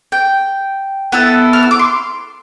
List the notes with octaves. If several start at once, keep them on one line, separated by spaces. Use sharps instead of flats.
G5
B3 E4 A4
F6
E6
D6
C6